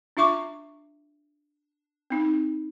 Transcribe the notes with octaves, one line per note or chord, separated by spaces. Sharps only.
D4 F4 E5 C#6 D6
C4 D#4